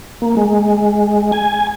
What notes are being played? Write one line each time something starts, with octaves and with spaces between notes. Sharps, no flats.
A#3
G#3
G#5